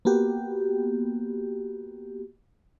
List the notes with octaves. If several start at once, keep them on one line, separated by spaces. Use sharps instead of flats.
A#3 B3 F#4 G4